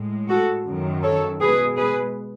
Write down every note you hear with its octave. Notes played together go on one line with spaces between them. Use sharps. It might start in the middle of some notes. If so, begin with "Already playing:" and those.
Already playing: A2 G#3
F#4 A4
F#2 D#3 F#3
A4 C#5
B2 G#3 G#4 B4
G#4 B4